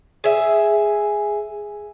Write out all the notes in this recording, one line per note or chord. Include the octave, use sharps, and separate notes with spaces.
G#4 E5